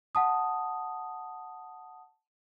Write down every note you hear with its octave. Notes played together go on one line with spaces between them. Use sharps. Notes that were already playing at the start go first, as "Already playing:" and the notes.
F#5 A5 D#6